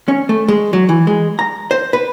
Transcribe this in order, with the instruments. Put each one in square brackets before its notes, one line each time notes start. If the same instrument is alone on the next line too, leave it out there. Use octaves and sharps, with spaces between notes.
[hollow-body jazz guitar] C#4
A3
G#3
F#3
E3
G#3
A#5
C5
B4